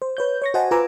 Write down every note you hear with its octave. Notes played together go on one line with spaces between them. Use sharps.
C5
B4 C#5 G6
C#5 C#6 A#6
F#4 C5 D#5 F#5 G#5 A5
F4 B4 G#5 A#5 D6 E6